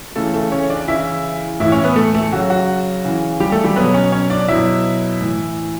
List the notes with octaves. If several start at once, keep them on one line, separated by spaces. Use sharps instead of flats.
C#3 E3 A3 A4
A3 A4
C#4 C#5
D4 D5
C#3 E3 E4 E5
A2 E3 E4 E5
C#4 C#5
B3 B4
A3 A4
A3 A4
C#3 F#3 F#4
F#4
C#3 E3
G3 G4
A3 A4
G3 G4
B2 F#3 B3 B4
C#4 C#5
C#4 C#5
D4 D5
B2 F#3 E4 E5
A2 E3